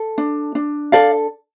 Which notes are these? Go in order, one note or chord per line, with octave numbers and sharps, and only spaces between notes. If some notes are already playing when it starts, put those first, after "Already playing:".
Already playing: A4
D4
D4
A4 D5 F5